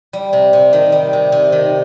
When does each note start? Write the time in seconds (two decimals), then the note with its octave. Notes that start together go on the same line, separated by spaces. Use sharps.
0.13 G3
0.33 C3
0.53 C3
0.73 D#3
0.92 G3
1.13 C3
1.32 C3
1.52 D#3